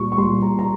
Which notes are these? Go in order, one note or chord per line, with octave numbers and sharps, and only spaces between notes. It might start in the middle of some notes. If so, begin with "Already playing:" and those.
Already playing: A#2 G3 C#6
C#6
A#2 G3 C6
A#5
A#5